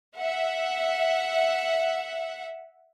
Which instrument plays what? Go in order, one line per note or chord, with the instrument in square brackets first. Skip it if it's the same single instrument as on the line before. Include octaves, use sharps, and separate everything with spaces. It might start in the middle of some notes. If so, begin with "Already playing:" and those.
[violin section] E5 F#5